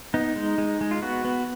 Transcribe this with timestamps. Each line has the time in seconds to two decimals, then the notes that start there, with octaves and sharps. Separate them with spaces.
0.14 B3 D#4
0.36 G#3
0.58 G#3
0.81 G#3
0.91 F4
1.02 B3 F#4
1.25 B3